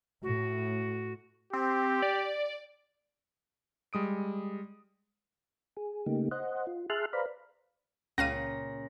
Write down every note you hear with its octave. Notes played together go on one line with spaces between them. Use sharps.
A2 F#4
C4 G4
D5
G3 G#3 D#6 D7
G#4
C#3 A3 A#3 D#4 G4
C5 D#5 F#5
F4
G#4 E5 A5 C6 F6 F#6
B4 C5 D5 F5 A#5 B5
C#2 A#2 C#3 C#4 F5 A#6 D#7